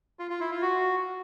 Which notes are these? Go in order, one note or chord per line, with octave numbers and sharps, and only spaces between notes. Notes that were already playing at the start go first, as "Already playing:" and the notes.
F4
F4
E4
F4
F#4